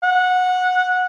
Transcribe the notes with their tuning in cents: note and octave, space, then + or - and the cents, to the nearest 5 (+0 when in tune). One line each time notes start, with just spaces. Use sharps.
F#5 -15